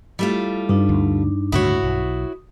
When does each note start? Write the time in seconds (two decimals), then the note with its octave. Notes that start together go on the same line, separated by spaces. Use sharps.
0.19 G3 A3 E4 F4
0.69 G2 D4 D#4
0.89 D2
1.52 C#2 A2 D3 E4 F#4 C#5 D#6
1.83 B1